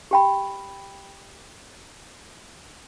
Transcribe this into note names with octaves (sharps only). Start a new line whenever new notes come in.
G4 G5 B5